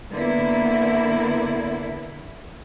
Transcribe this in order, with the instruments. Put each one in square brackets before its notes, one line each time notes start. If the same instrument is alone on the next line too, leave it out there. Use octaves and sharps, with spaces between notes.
[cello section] D3 A#3 B3 E4